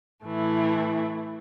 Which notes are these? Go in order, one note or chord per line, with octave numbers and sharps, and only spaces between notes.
A2 E3 A3 E4